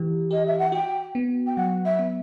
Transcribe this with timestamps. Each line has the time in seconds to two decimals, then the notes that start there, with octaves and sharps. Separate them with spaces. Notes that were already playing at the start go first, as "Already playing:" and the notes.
Already playing: E3 G4
0.31 G4 D#5
0.46 E5
0.59 F#5
0.72 F#4 G5
1.15 B3
1.47 G5
1.57 F#3 F#5
1.85 E5
1.99 B3